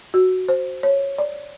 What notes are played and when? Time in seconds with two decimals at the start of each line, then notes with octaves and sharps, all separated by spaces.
0.14 F#4
0.48 C5
0.83 C#5
1.18 D5